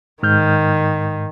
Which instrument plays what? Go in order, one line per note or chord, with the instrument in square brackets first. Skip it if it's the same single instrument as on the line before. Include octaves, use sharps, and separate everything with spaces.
[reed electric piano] G#2 F6 G6 [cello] D#3